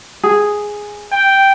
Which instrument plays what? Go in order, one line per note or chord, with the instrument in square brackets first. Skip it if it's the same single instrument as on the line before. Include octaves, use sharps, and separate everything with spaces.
[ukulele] G#4
[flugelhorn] G5